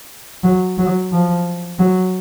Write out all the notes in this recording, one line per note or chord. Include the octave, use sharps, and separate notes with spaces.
F#3
F#3
F3
F#3